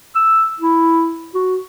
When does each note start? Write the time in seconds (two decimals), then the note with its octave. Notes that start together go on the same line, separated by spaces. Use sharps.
0.15 E6
0.60 E4
1.34 F#4